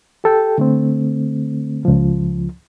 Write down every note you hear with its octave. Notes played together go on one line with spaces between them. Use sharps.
G4 A4 G5
D3 A3 C4
C#2 F3